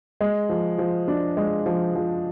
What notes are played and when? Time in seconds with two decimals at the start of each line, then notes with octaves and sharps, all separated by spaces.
0.21 G#3
0.49 F3
0.78 F3
1.08 D4
1.37 G#3
1.66 F3
1.95 F3